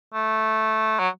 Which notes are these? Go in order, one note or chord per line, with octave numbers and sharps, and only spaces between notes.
A3
F#3